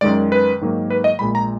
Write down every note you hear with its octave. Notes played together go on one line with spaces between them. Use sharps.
F#2 D#3 G#3 D5
B4
G#2 D#3 F#3 A#3
B4
D#5
A#1 A#2 G#3 B5
A#5